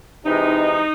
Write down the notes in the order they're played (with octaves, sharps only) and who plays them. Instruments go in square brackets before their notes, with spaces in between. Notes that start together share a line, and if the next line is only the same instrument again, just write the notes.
[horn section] C3 E3 G#3 D#4